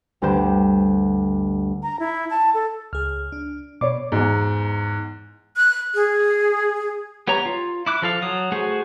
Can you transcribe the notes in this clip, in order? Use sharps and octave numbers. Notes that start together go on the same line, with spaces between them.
G1 D2 G4 C5 G6 E7
A#5
E4
A5
A4
C#2 G#4 F6
D4
B2 C#5 D5 D6
E2 G#2
F#6
G#4
B3 G4 C#5 A#5
F4
E4 D6 F#6
F3 A4 F5
F#3 D#6
A3 F#4 G#4 C5